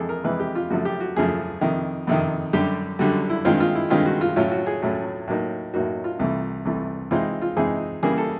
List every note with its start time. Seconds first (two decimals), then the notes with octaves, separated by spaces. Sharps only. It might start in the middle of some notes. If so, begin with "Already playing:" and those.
Already playing: F2 C3 E3 G#3 G#4 A4
0.09 A#4
0.24 F2 C3 E3 G#3 B4
0.40 G4
0.55 F4
0.70 F#2 C#3 F3 A3 F#4
0.85 G4
1.00 F#4
1.16 F#2 C#3 F3 A3 G#4
1.61 F2 C3 D#3
2.07 F2 C3 D#3
2.53 F#2 D3 G3 G4
2.99 F#2 D3 G3 F#4
3.30 E4
3.45 G2 D#3 G#3 C4 F4
3.60 F4
3.75 E4
3.90 G2 D#3 G#3 C4 F4
4.06 F#4
4.21 F4
4.36 A2 F#3 A3 C#4 F4
4.52 F#4
4.67 G#4
4.82 A2 F#3 A3 C#4
5.28 A2 F#3 A#3 D#4
5.74 A2 F#3 A#3 D#4 F#4
6.04 F4
6.19 C2 C3 E3 A3
6.65 C2 C3 E3 A3
7.11 C3 E3 G#3 C4 D#4 F4
7.42 F4
7.56 C3 E3 G#3 C4 D#4 G#4
8.03 C#3 E3 G3 A#3 G#4
8.18 A4